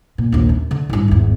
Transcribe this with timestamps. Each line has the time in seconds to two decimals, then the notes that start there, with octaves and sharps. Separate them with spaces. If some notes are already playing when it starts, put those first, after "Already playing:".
0.18 A#2
0.32 A#1 D#2
0.49 C#4
0.71 D3
0.89 A1 G2
1.08 G#1 E2